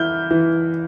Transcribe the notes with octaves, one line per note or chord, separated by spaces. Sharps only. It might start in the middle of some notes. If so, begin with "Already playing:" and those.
Already playing: E3 E4 F6 G6
E3